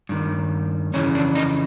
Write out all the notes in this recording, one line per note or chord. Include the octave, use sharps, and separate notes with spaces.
G2 D#3
F2 C#3 E3 C#4
D4
D#4